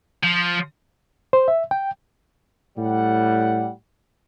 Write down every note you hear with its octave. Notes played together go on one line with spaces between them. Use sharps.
F3
C5
E5
G5
A2 G3 F#5